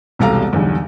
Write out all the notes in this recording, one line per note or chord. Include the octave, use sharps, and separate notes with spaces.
E1 C2 G4 A4 F5 A#5
B1 E2 D3 G3